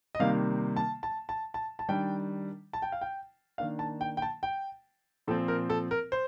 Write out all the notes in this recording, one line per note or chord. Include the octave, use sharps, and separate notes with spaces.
D#5
C3 D#3 G3 A#3 F5
A5
A5
A5
A5
A5
D#3 G3 D4 G5
A5
G5
F5
G5
D#3 A#3 D4 F5
A5
G5
G5
A5
G5
A#2 F3 C4 A4
A#4
A4
A#4
C5